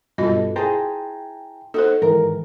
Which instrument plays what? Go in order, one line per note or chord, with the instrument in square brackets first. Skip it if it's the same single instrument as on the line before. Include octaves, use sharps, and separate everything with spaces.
[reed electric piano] G2 B2 A4 [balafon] F4 F#4 D#5
[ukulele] E4 G#4 C5 [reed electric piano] G5 A5 A#5
[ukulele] D#4 F#4 [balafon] A4 C5
[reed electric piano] G#2 D#3 E3 [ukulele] A#4